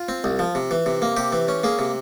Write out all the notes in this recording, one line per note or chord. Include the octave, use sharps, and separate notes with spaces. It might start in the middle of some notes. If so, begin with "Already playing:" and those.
Already playing: F4
C4
C2
F3
C3
E3
C3
A#3
C3 G4
E3
C#4
A#3 G#4
C3